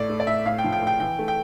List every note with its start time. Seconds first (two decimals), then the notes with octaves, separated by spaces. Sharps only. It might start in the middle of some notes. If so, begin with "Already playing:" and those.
Already playing: A2 D5
0.09 A3
0.20 D5
0.27 A2 E5
0.45 A2 F5
0.58 G5
0.64 F3
0.72 G5
0.82 A2
0.87 G5
1.00 E3 G5
1.19 A3
1.28 G5